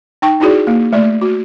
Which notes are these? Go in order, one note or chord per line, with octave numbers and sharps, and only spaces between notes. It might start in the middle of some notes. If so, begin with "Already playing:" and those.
D#4 G5 C#6
D#4 E4 F#4 G#4 D5
A#3
A3 D5
F#4